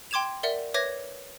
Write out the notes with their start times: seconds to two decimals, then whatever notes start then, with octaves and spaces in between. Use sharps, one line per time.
0.11 G5 C6 D6 G#6 E7 F7
0.43 A#4 D5 E5 F#5 G7
0.74 B4 C#5 E5 D6 G#6 A#6